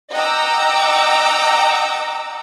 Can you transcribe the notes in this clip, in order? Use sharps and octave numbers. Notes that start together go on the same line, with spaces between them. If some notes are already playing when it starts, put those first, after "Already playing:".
D#5 F#5 G5 A#5 D6 E6